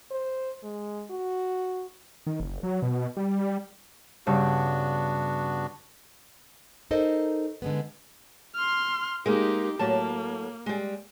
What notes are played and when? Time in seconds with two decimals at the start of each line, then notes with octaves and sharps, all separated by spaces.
0.11 C5
0.63 G#3
1.10 F#4
2.27 D#3
2.40 F#1
2.63 F#3
2.82 B2
3.17 G3
4.27 G2 C#3 B3 D4 F#4
6.91 D#4 A4 A#4 C5 D#5
7.62 D3 G#3 B3
8.55 C6 F6
9.26 G#3 A#3 D#4 G4
9.79 A2 F#3 A#3 A5
10.66 G3 G#3